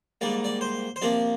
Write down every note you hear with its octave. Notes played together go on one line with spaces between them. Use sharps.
G#2 G3 A#3 D5
D5
C5
C5
C3 F3 A#3 D5